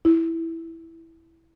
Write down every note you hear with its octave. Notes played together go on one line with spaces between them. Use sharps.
E4